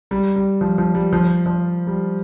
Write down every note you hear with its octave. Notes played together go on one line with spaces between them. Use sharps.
G3
G3
F3
F3
G3
F3
F3
G3